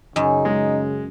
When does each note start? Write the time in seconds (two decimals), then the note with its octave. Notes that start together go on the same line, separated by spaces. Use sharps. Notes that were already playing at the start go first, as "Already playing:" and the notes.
0.16 F#2 C#3 D#4
0.45 G#3